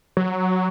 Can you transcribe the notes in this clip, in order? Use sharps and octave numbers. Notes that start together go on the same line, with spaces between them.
F#3